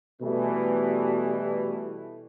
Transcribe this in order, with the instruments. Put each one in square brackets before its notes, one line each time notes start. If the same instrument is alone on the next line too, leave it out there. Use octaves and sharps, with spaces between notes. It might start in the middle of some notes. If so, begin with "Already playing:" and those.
[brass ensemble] B2 E3 G3 A3